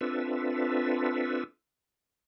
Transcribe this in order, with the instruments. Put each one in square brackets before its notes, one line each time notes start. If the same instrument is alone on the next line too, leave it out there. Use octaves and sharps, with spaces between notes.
[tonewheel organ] C4 D4 F4 A4 B4 E5